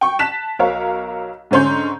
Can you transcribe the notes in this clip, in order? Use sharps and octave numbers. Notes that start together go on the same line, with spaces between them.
G5 C#6
A5 F#6 B6 E7
B1 A#4 C#5 F5
G#2 D3 C#4 C6 G6